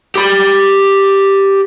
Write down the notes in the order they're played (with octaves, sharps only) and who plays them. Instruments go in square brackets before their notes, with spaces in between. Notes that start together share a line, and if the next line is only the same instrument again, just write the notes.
[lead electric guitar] G4 B5